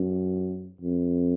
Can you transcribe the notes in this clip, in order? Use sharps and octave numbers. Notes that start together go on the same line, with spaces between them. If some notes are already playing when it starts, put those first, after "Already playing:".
Already playing: F#2
F2